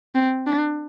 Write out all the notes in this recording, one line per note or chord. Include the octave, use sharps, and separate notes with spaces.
C4
D4